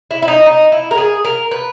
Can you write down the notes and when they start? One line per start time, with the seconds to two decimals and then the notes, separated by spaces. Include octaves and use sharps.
0.11 E4
0.22 E4
0.28 D#4
0.46 D#4
0.72 E4
0.91 A#4
0.98 G#4
1.25 A#4
1.51 B4